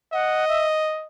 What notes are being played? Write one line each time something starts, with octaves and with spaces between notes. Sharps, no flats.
D#5 F#5
E5